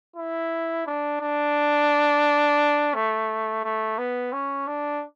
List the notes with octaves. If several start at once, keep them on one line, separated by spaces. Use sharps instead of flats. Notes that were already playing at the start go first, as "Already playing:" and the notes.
E4
D4
D4
A3
A3
B3
C#4
D4